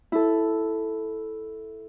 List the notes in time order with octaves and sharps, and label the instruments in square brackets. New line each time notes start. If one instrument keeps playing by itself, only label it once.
[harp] E4 A4